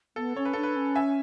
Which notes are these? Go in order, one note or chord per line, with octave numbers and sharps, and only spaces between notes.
B3 A4
C#4 C#5
B4
D4 A4
B4
C#4
E5 G#5